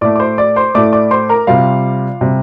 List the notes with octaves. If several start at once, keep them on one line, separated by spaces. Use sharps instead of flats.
A2 A3 D5 D6
D6
C5 C6
D5 D6
C5 C6
A2 A3 D5 D6
D5 D6
C5 C6
A#4 A#5
C3 G3 F4 F5
C3 G3